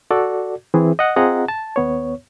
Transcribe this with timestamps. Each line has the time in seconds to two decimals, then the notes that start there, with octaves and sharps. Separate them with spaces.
0.11 F#4 A4 D5
0.74 E3 C4 G#4
0.99 D#5 F#5
1.16 C4 F4 G#4 D#5 F#5 A#5
1.48 A5
1.76 D#2 B3 C#5